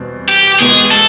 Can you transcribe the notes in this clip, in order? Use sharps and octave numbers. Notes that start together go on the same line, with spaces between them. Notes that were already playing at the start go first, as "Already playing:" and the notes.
Already playing: E2 B2 G3 C4
G4
E2 B2 G#3 G#4
A4